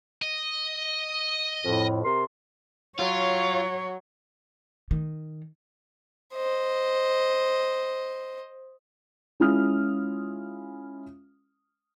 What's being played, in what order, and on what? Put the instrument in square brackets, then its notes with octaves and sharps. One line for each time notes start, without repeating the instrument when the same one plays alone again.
[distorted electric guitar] D#5
[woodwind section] F2 A2
C3 A#4 C6
[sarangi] F#3 [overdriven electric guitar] F4 [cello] C#5
[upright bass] D#3
[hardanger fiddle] C5 D#5
[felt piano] G#3 C#4 E4 F4 D#6 F6